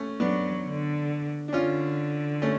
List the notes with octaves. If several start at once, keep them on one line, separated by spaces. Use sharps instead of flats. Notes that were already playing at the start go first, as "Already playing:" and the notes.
Already playing: A3 C#4
F#3 B3 D4
D3
D4
D3 C#4 F4
A3 C#4